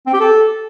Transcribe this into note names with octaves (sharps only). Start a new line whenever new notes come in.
C4
G4
A4